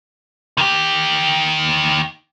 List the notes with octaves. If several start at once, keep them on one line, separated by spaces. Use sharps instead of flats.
D#3 G4